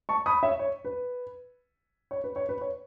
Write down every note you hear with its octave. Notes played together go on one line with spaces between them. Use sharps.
A5 C#6
B5 D#6
C#5 E5
C#5
B4
C#5
B4
C#5
B4
C#5